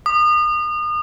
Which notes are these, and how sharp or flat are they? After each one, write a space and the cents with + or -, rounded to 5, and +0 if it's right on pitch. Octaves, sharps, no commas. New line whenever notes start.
D#6 -35